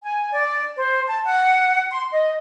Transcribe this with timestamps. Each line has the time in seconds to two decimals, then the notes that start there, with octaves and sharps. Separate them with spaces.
0.03 G#5
0.31 D5
0.77 C5
1.07 A5
1.25 F#5
1.90 C6
2.10 D#5